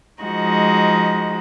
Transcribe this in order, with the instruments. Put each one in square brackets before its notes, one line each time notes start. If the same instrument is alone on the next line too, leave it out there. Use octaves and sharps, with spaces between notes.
[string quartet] F3 G#3 D#4 F#4